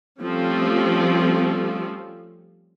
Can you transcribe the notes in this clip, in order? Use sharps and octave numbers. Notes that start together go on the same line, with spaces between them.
F3 G3 A3 C4 C#4